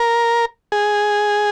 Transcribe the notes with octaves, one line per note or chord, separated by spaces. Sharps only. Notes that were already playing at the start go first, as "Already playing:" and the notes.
Already playing: A#4
G#4